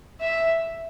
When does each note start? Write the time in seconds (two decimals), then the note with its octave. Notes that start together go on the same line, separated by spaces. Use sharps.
0.21 E5